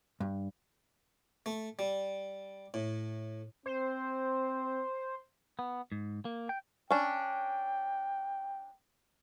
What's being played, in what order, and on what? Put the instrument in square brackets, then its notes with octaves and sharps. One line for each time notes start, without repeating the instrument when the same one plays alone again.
[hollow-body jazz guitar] G2
[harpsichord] A3
G3
A2
[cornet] C4 [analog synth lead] C5
[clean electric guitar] B3
G#2
A#3
G5
[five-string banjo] C#4 D4 [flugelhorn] G5